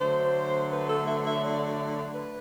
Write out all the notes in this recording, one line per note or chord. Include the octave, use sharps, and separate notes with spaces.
D3 F#3 A3 C5
B4
A4
E5
E5
D5
B4